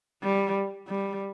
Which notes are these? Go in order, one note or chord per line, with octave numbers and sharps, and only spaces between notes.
G3
G3